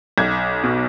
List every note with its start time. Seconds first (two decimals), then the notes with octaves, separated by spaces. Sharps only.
0.18 B1 G#6
0.64 B2